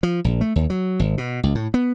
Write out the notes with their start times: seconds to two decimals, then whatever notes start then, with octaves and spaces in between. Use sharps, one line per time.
0.03 F3
0.24 A#1
0.41 A3
0.56 D#2
0.70 F#3
1.00 G#1
1.18 B2
1.43 C#2
1.55 A2
1.74 B3